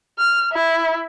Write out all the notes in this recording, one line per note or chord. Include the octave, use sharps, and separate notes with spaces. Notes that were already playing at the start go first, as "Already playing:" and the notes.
F6
E4